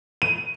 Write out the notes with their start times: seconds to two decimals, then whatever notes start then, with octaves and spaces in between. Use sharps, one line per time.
0.22 D#7